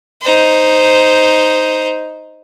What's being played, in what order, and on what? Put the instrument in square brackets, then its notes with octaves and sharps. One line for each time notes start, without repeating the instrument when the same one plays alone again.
[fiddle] D#4 C5